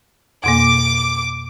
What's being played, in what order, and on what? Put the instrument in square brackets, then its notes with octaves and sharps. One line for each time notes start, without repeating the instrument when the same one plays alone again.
[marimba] F2 B2 A#3 [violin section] D6